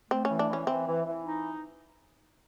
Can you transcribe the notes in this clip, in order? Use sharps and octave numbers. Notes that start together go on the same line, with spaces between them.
A3 C4
C#4
E3
D4
E3 C#4
E3 C4
E3
E3
D#4